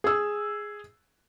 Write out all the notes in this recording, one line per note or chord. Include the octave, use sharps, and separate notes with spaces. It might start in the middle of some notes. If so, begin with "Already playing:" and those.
G#4 E6